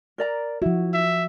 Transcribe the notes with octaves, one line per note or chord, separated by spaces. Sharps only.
A#4 D5 A#5
F3 E4 F#4
E5